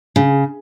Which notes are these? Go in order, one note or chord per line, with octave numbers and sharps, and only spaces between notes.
C#3